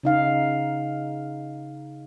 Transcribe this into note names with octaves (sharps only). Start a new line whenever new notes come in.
C#3 D#4 F5